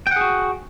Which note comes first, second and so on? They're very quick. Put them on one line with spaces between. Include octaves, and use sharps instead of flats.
G5 F#5 G#4 F#4